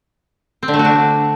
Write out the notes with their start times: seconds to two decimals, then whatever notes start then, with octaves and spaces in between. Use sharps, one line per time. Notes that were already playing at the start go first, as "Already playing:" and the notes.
0.63 C4
0.68 D3
0.74 A3
0.79 F#4
0.85 D4